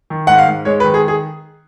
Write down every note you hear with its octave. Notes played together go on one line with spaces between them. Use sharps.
D#3
G#2 F#5
F5
G#2
G#3 C#5
B4
D#3
G#4
G#4